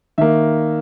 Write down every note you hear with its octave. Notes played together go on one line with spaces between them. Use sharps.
D#3 A#3 E5